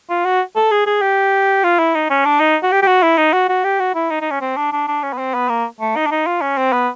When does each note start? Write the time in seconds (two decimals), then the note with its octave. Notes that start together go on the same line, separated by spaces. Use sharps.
0.10 F4
0.25 F#4
0.56 A4
0.71 G#4
0.87 G#4
1.02 G4
1.64 F4
1.79 E4
1.95 D#4
2.10 C#4
2.25 D4
2.40 D#4
2.63 F#4
2.72 G4
2.82 G4
2.87 F#4
3.03 E4
3.17 D#4
3.33 F#4
3.49 F#4
3.64 G4
3.80 F#4
3.95 E4
4.10 D#4
4.21 D#4
4.31 C#4
4.41 C4
4.57 D4
4.73 D4
4.88 D4
5.03 C#4
5.13 B3
5.18 C4
5.34 B3
5.49 A#3
5.81 A3
5.96 D#4
6.07 D4
6.11 D#4
6.26 F4
6.41 C#4
6.58 C4
6.72 B3